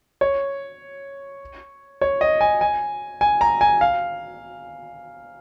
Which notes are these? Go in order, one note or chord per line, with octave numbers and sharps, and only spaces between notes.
C#5
C#5
D#5
G#5
G#5
G#5
A#5
G#5
F5